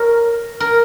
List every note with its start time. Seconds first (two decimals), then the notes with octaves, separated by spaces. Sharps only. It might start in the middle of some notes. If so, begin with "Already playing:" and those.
Already playing: A#4 C#5
0.60 A#4